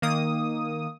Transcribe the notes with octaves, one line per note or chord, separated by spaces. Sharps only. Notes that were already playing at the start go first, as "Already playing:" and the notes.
D#3 A#3 D#6